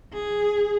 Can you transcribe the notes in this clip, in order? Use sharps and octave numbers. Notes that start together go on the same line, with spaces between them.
G#4